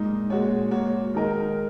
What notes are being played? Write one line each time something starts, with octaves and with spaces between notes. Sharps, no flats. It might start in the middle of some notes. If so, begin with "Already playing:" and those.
Already playing: A#2 G#3 A#3 D#4
A#2 G#3 F#4 C#5
A#2 A#3 F#4 C#5
D#3 G#3 D#4 A#4 D#5